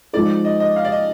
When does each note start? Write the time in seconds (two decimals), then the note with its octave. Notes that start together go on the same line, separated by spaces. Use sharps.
0.13 F3 G#3 D#4 G#4 D5
0.45 D#5
0.60 D#5
0.76 F5
0.85 D5
0.92 D#5